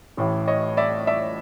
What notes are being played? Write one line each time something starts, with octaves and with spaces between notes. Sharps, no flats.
A1 A2 E3
C#5 D#5
D5 E5
D5 E5